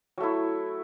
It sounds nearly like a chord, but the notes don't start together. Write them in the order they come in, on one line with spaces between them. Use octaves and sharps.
F#3 A3 E4